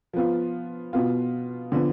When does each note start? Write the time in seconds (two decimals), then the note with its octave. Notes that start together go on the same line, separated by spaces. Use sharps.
0.13 F3 B3 F4
0.93 B2 B3 F4
1.72 D3 F3 B3